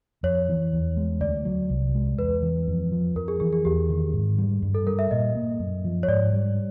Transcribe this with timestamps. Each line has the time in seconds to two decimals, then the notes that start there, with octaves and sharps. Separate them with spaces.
0.23 F2 C#5
0.49 E3
0.73 E2
0.97 G#3
1.21 D2 D5
1.45 F#3
1.70 C2
1.95 G#3
2.19 E2 B4
2.42 E3
2.68 F2
2.92 F3
3.16 F2 A#4
3.28 G#4
3.40 E3 G#4
3.53 G#4
3.65 E2 G4
3.90 D#3
4.13 G#2
4.38 G3
4.62 G2
4.75 A4
4.87 G3 A#4
4.99 E5
5.11 A#2 D#5
5.35 A#3
5.59 F#2
5.85 F3
6.03 C#5
6.08 G#2 D5
6.33 G3